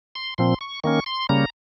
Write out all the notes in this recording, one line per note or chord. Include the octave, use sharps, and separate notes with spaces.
C6
A#2 F3 C4 C6
C#6
D#3 A#3 C#4 C#6
C6
C#3 G3 A#3 C#4 A#5